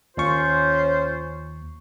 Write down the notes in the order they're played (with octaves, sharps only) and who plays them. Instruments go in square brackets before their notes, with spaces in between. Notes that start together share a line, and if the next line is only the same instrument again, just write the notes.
[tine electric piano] D#2 C#6 [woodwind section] C#4 F4 C5